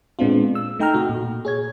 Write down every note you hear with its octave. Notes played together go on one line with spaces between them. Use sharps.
A#2 G#3 B3 C4 D4 F4
E6
A3 D#4 G5 A#5 F6
C3 F#4
A#2
G#4 C#5 G#6